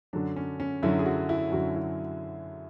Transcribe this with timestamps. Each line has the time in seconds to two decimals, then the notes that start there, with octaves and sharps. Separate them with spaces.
0.13 F#2 D3 F#3 D4
0.36 C#4
0.60 C#4
0.83 F#2 D3 F#3 E4
0.99 G#4
1.06 F#4
1.29 E4
1.52 F#2 D3 F#3 F#4
1.75 E4